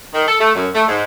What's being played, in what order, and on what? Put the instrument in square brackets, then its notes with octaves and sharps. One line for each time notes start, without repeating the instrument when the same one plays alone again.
[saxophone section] D#3
A4
A3
F#2
A3
G#2